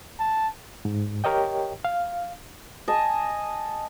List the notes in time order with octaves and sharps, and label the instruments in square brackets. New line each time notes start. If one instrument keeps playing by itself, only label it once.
[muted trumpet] A5
[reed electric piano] G#2
G4 A#4 C#5 D#5 G5
F5
[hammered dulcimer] D#5 G#5 A5